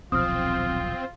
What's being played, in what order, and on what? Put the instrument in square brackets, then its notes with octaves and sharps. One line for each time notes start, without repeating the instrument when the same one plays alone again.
[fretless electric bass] D#1 B1 F3 [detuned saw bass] C4 [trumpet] F4 [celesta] D#6 F6